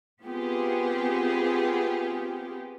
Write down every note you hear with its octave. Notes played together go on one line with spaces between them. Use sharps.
B3 C4 F4 G4 G#4